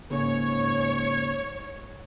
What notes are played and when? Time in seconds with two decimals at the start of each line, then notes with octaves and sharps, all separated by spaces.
0.11 G#2 C#3 A#3 C#4 C#5